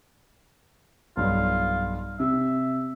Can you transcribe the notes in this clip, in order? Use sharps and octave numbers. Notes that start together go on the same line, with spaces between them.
B1 G2 F4
C3 E5